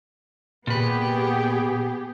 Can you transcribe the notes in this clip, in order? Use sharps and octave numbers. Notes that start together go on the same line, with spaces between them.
A#2 B3 G4 G#4 B4